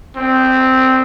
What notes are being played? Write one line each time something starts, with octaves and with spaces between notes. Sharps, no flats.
C4